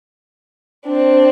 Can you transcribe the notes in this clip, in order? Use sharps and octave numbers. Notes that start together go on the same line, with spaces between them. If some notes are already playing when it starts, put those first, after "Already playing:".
C4 D4